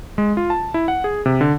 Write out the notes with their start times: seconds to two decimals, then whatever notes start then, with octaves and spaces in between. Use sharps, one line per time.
0.18 G#3
0.37 F4
0.50 A5
0.74 E4
0.88 F#5
1.04 G#4
1.26 C3
1.41 D3